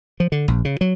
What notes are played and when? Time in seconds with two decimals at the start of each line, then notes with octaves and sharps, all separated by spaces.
0.20 F3
0.32 D3
0.48 A#1
0.65 C#3
0.81 F#3